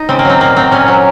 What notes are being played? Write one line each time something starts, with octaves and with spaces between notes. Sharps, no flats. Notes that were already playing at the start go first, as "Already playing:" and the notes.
Already playing: D#4
C#3 C4
A#3
F#3
C4
A#2 A#3
F#3 C4
A#2 C#4
F#3